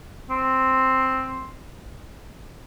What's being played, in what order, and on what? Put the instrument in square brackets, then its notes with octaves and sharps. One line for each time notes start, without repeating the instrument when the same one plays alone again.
[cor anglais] C4